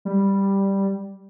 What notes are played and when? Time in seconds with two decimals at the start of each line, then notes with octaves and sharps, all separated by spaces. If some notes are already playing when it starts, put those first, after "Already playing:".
0.05 G3